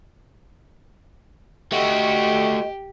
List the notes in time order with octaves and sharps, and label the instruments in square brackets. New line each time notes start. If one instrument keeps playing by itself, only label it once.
[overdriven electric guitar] A3 F#4 [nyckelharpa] G4 [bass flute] D#5